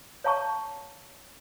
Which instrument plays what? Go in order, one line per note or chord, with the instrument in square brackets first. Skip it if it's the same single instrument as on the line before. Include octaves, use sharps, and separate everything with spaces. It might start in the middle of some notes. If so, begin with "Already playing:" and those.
[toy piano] C#5 F5 A5 A#5 C#6